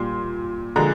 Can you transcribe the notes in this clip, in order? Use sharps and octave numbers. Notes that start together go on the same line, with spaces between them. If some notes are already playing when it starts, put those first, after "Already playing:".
Already playing: A#2 G3 C6
D3 F3 G#3 A#5